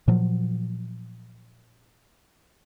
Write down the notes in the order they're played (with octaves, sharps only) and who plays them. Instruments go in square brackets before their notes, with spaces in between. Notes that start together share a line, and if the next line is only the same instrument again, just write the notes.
[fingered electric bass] A#2 F3 F#3